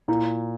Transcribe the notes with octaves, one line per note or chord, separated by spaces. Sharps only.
A#2 E4